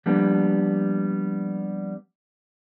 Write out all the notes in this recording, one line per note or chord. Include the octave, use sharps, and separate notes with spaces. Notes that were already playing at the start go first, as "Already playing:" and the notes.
F3 G3 A#3 B3 D4